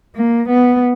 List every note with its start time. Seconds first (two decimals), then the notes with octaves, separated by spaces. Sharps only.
0.16 A#3
0.49 B3